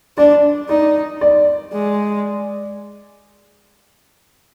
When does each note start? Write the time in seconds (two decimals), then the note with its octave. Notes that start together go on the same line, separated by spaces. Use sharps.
0.17 D4 D5
0.69 D#4 D5
1.21 D5
1.73 G#3